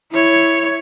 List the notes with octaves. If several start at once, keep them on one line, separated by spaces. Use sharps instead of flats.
E4 C#5